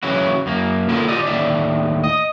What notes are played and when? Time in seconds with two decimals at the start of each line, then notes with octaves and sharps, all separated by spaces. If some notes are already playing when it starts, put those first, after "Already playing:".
0.03 C#3 E3 F#3 C#4 E4 F#4
0.46 F#2 A#3
0.89 A#3 B3 E4 F4 A4 A#4
1.08 F4 G4 D5 D#5
1.27 D#2 A2 D5 E5
2.04 D#5